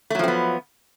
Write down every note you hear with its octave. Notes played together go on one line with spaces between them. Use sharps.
F3 F#3 A3 B3 C4